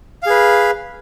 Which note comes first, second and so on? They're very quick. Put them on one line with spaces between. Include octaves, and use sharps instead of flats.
F5 G#4 B4